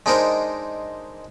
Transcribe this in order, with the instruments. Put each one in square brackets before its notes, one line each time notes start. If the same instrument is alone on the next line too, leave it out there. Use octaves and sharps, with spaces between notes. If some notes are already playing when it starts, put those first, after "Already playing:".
[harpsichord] G#3 D4 D#4 A#4 C5